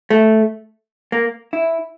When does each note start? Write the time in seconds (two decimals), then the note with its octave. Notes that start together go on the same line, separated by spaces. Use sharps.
0.10 A3
1.12 A#3
1.53 E4